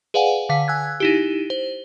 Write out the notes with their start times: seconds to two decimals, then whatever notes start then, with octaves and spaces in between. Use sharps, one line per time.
0.14 G#4 B4 D5 F5 F#5 G#5
0.49 D3 F5 B6
0.68 G#5 E6 F#6 G#6
1.00 D#4 E4 G4
1.50 C5